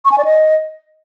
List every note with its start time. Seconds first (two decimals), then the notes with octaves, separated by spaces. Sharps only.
0.05 C#6
0.12 G#5
0.18 D5
0.25 D#5